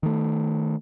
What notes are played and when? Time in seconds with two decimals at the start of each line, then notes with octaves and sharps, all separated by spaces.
0.03 D#3 A3